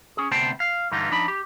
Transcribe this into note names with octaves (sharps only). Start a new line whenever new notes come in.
C#4 G#4
D2 C3 B3 C5 G5 A5
F5
G2 D3 E3 G3 D#4 F4
F3 D4 D#4 B5
G4